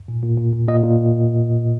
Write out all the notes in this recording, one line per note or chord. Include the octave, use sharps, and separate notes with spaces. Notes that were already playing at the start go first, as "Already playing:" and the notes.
A#2
A#2
A#2
A#2
A#2 D#5
A#2